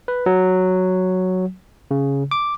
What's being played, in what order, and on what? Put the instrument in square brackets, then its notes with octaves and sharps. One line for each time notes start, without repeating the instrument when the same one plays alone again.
[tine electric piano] B4
F#3
C#3
D6